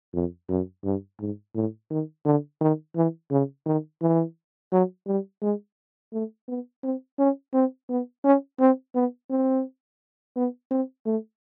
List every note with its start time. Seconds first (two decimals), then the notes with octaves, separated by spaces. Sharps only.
0.14 F2
0.49 F#2
0.84 G2
1.20 G#2
1.55 A2
1.90 D#3
2.25 D3
2.61 D#3
2.96 E3
3.31 C#3
3.66 D#3
4.02 E3
4.72 F#3
5.07 G3
5.42 G#3
6.13 A3
6.48 B3
6.83 C4
7.19 C#4
7.54 C4
7.89 B3
8.24 C#4
8.60 C4
8.95 B3
9.30 C4
10.36 B3
10.71 C4
11.06 A3